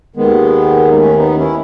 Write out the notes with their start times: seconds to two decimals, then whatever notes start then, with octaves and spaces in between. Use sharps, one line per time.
0.16 D#2 D#3 G#3 B3
0.91 D#4
0.97 A3 C#4
1.17 B3 D#4
1.37 C#4 E4